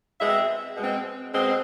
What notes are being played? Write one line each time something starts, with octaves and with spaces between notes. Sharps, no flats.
B2 G#3 C4 E5
B2 G#3 C4
B2 G#3 C4